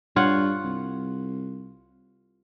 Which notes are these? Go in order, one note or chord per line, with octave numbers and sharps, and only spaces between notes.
G2 F4 C#5 F#5
C2